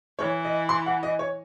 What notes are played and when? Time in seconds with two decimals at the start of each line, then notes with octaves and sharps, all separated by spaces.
0.19 E3 C#5
0.45 D#5
0.69 C6
0.86 F#5
1.03 D#5
1.19 C#5